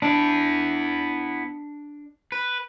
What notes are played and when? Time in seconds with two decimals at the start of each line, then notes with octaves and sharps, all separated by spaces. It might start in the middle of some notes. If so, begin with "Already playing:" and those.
0.02 B3 D4 E4
2.32 B4